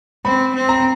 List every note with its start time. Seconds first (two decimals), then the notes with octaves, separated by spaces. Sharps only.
0.25 C4 B5
0.55 C4
0.69 A#5